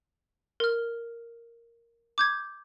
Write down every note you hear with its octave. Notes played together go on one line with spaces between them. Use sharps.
A#4 F6
D6 G6 G#6